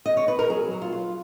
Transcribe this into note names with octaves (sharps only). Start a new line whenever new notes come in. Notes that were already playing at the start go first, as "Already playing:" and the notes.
D#5
C#5
B4
A#4
F#3 G#4
F#3
F4
F4